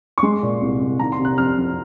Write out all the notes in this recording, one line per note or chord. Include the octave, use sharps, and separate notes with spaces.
C#6
G#3 C6
A#2
C2
C2
D#3 A#5
C6
C3
F#6
F2 F6
F2